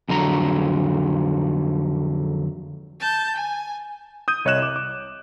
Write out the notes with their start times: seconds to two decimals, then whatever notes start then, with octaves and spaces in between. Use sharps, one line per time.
0.09 F2 D3 F#3 A#5
3.00 A5 G6
3.36 G#5
4.28 D#6 G6 D#7
4.45 C2 C#5 D#5 F#6 E7
4.62 D6
4.76 D6